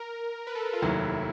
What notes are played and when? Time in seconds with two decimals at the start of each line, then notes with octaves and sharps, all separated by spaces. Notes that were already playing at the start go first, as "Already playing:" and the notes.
Already playing: A#4
0.47 B4
0.55 A4
0.73 F4
0.82 F1 D#2 D#3 F#3 A3 E4